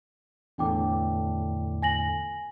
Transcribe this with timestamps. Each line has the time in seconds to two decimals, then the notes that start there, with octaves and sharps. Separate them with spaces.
0.58 E2 A2 D3 D4 G5 D6
1.82 G#5 A#6 F#7